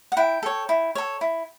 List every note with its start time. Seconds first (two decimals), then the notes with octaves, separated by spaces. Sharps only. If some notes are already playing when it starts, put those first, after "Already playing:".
0.12 F#5
0.17 E4 G5
0.43 A4 C#5
0.69 E4
0.95 A4 C#5
1.21 E4